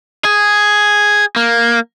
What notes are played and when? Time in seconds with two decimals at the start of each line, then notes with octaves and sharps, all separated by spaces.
0.25 G#4
1.36 A#3